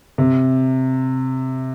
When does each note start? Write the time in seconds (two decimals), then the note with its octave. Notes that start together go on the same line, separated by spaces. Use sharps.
0.18 C3